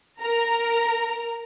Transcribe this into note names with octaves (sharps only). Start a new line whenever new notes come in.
A#4 A#5